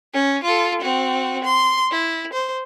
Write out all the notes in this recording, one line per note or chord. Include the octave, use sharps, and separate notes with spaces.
C#4
F4 A4
C4 F#4
C6
E4
C5